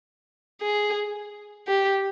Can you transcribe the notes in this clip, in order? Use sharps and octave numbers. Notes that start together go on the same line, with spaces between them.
G#4
G4